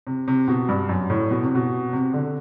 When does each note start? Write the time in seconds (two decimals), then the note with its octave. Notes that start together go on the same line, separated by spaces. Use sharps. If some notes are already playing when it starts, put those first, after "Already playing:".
0.07 C3
0.28 C3
0.48 B2
0.69 G2
0.89 F#2
1.10 A2
1.31 B2
1.43 C3
1.55 B2
1.93 C3
2.13 D3